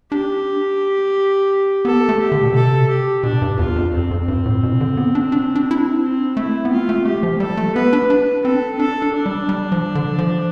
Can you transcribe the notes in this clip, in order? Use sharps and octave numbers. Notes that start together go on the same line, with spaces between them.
D4 G4
B3 A4
A3
G4
D3
B2
C3 A4
G4
B2 D4
G2
E2 F4
F2
F2 C4
F2
G2 C4
A2
B2
D3
B3
D4
D4
D4
E4
D4
C4
A3 E4
B3
C4 F4
A3
A3 G4
F3
G3 A4
A3
B3 B4
D4
D4 B4
C4 A4
D4 A4
D4
D4
G3
G3
F3
D3
F3